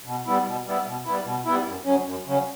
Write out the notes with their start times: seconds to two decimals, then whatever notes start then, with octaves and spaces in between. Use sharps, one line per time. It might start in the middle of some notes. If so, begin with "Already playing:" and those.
0.06 B2
0.27 G3 B3 E4
0.47 B2
0.67 G3 B3 E4
0.87 B2
1.06 G3 B3 E4
1.26 B2
1.45 G3 B3 E4
1.66 F#2
1.85 C#3 F#3 C#4
2.06 F#2
2.26 C#3 F#3 C#4